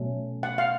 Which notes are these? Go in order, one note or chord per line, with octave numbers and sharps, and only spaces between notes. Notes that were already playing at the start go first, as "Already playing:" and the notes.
Already playing: B2 F#3 A3 C#4
F#5
F5